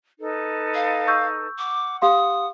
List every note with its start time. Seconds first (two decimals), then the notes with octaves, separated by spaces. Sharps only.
0.19 D#4 A4 B4
0.75 F5
1.08 C#6 E6 G6
1.58 F#5 D6
2.02 G4 F5 C6 D#6